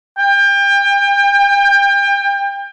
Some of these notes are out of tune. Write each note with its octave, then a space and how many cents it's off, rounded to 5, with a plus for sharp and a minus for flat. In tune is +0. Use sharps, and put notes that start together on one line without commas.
G5 +30